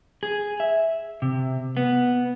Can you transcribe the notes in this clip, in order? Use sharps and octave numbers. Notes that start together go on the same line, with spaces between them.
G#4
E5
C3
B3